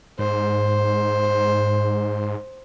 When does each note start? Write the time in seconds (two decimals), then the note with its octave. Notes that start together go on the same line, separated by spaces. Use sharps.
0.19 G#2 C5